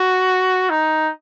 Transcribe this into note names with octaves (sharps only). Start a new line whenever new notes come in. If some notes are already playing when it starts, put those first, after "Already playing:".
Already playing: F#4
D#4